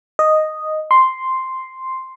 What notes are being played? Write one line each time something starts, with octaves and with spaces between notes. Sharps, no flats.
D#5
C6